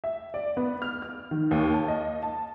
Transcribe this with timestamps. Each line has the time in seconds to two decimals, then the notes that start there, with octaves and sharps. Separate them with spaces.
0.04 E5
0.34 D5
0.57 B3
0.82 F6
1.02 F6
1.31 D#3
1.51 D#2
1.73 A5
1.88 D#5
2.23 A5